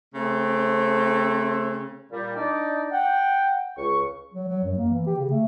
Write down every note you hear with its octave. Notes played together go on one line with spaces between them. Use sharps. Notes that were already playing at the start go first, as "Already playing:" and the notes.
C#3 A3 C4
A#2 G3
D4 D#4 D5
F#5 G5
C#2 C#6
F#3
F#3
F#2
A#3
E3
G4
C#3
A3